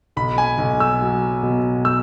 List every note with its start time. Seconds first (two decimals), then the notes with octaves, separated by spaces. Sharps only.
0.16 B1 B5
0.38 G#5
0.58 B1
0.80 E6
1.01 F#3
1.43 B2
1.85 E6